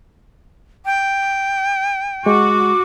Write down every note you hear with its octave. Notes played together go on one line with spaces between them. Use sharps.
G5
G#3 F#4 D6